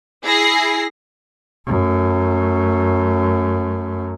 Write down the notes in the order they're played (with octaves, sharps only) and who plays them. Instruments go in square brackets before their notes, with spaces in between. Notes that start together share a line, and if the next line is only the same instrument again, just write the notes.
[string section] E4 G#4 A#6 C7
[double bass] F#2 A3